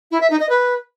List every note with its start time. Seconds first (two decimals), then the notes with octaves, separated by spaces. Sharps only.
0.11 E4
0.21 E5
0.30 D#4
0.40 D#5
0.49 B4